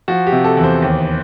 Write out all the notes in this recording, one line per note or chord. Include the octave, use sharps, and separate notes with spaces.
F3 F#4
G4
C3
A4
E2
C5
D#2